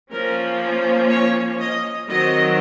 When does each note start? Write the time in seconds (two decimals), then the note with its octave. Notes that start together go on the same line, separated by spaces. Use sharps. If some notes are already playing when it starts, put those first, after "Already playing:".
0.11 F3 A#3 C#4 A#4
1.09 C#5
1.60 D#5
2.09 D#3 F#3 C4 D#5